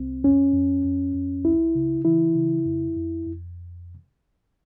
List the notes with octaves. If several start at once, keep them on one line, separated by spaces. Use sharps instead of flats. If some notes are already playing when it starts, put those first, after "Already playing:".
Already playing: C2 C4
F2 C#4
F2
F2
F2
C#2 E4
C#3
E3 E4
C#3
F2
F2
F2